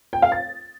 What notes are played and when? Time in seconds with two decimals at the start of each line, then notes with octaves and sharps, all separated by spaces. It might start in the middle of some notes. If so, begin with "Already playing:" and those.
0.13 G5
0.22 F5
0.32 A6